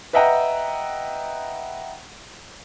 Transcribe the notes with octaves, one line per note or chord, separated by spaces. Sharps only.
B4 D#5 E5 F#5 G5 A#5